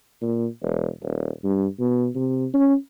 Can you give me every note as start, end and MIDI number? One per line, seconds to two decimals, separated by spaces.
0.22 0.47 46
0.63 0.87 28
1.03 1.30 27
1.44 1.66 43
1.80 2.07 47
2.15 2.46 48
2.54 2.74 61